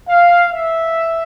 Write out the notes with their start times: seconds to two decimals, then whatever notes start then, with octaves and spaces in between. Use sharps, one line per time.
0.08 F5
0.51 E5